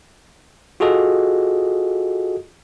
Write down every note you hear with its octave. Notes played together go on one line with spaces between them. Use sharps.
F4 F#4 G#4 A4 D#5